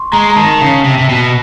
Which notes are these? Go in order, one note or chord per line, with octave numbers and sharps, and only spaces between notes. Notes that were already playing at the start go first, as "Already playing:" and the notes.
Already playing: C6 C#6
G#3 A#5
A#5
D#3 A5
C#3
C3
C3
B2